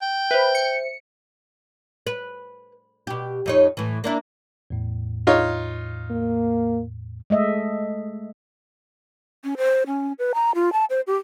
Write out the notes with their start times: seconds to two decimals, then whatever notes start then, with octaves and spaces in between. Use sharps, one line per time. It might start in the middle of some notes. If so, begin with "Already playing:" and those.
0.02 G5
0.31 B4 C5 E5
0.55 C#7
2.07 B4
3.07 B2 G4
3.46 F2 D#4 C#5
3.77 A2 E3
4.04 A#3 D4 E4
4.70 E2 A2
5.27 D#4 F4 C#5
6.11 A#3
7.30 G#3 A3 D#5 E5
9.44 C#4
9.57 C5
9.87 C#4
10.19 B4
10.34 A#5
10.55 F4
10.73 A5
10.90 C5
11.07 G4